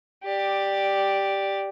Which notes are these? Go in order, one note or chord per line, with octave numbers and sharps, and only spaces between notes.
G4 D5